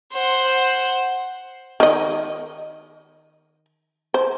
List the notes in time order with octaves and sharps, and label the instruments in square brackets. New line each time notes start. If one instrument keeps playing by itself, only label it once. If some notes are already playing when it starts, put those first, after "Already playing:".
[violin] C5 F#5
[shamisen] D#3 D#5
C5